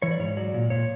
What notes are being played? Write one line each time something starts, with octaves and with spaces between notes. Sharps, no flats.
E3 C#5
D5
G#2 C#5
F#3 D5
A#2
A#2 C#5